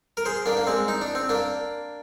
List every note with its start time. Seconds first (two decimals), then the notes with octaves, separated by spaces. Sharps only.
0.17 A#4
0.25 G#4 C5
0.46 A#3 D4
0.57 A#3
0.67 G#3 C4
0.88 D#4
1.01 D4
1.15 C4
1.29 A#3 D4